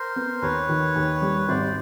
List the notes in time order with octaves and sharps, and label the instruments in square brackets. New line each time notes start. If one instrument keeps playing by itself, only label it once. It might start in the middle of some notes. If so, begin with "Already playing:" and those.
Already playing: [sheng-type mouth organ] A#4 C5
[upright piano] B3
[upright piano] D#2 [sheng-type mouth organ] B4 C#5
[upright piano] D#3
D#2
G3
[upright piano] G#1 [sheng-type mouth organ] C5 D5